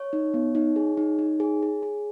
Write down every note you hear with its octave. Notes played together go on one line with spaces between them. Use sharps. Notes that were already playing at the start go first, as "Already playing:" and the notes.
Already playing: C#5
D#4
B3
D#4
G#4
D#4
D#4
G#4
G#4
G#4